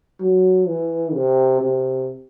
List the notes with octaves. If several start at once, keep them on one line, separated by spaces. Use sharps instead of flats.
F#3
E3
C3
C3